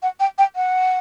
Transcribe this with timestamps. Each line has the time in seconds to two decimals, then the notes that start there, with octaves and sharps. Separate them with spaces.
0.02 F#5
0.20 G5
0.38 G5
0.56 F#5